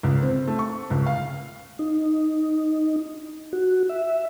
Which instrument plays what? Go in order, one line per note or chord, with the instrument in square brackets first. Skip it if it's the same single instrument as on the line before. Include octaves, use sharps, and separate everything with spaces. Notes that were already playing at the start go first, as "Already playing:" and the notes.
[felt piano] C#2
C4
A3
C#6
C#2
F5
[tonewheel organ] D#4
F#4
E5